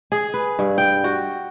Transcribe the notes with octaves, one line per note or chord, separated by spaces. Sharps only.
G#4
B4
G2
G5
F#4